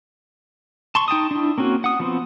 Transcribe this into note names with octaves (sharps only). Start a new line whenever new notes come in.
A5 C6 C#6
D#4 G5 A5 D#6
D4 E4
A#3 C4 C#4 F#4
F#5 D#6
F3 B3 C4